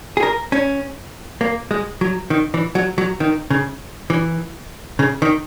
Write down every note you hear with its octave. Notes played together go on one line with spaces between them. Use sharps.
G#4
A#4
C#4
A#3
G#3
F#3
D#3
E3
F#3
F#3
D#3
C#3
E3
C#3
D#3